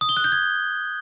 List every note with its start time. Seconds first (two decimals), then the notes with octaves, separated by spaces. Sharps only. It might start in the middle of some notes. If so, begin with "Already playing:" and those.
0.01 D#6
0.09 G7
0.17 F#6
0.24 G6
0.32 G#6